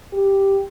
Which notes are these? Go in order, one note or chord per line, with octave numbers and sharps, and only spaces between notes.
G4